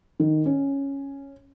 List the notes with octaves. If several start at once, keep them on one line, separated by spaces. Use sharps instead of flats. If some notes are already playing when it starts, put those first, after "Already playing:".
D#3
C#4